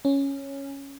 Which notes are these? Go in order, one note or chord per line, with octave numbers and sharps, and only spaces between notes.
C#4